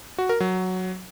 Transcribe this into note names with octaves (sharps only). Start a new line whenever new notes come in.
F#4
A#4
F#3